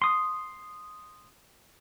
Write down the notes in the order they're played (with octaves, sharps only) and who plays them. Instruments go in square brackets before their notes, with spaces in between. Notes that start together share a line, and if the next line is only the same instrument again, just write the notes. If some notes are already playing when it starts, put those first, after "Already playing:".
[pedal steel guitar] C6 D#6